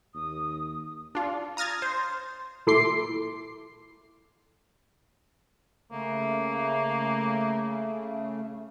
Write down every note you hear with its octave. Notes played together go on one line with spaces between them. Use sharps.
D#2 D#6
D4 F4
A#5 D#6 F6 G#6 A6
C5
A#2 E4 A4 C6 D6 C7
C#3 A3 A#3